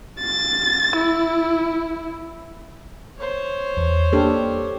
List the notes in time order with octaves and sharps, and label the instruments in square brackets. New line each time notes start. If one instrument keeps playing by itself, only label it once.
[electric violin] A6
E4
[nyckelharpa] C5 C#5
[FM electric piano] E2
[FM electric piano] A#3 [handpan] D4 G4 A4